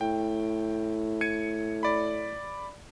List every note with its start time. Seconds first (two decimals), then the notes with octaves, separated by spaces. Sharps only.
0.01 A2 G5
1.21 G#6 C#7 D#7
1.83 D5 B5